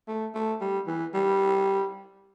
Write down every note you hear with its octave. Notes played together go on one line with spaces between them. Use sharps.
A3
A3
G3
E3
G3